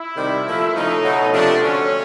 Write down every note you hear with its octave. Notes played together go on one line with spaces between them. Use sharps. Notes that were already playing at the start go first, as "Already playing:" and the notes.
Already playing: E4
C3 D#3 G3
A#2 F3 A3
C#3 F3 A3 D#4
B2 F#3 A3
C3 F3 A3 D4
D3 F#3 A3 C#4